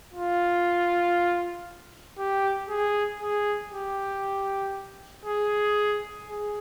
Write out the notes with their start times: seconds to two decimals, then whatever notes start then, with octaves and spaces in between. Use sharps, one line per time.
0.14 F4
2.18 G4
2.69 G#4
3.21 G#4
3.72 G4
5.25 G#4
6.28 G#4